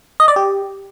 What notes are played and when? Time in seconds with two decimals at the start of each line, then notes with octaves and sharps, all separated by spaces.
0.20 D#5
0.28 D5
0.36 G4